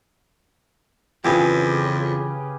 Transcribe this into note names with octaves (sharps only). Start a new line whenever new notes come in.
F2 C#3 E3 F4 G4 G#4 B4 C#5